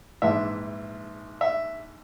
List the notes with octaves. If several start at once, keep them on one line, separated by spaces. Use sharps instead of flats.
A#1 G#2 E3 E5
E5